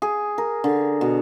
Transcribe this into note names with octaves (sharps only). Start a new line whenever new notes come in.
G#4
A#4
D3
B2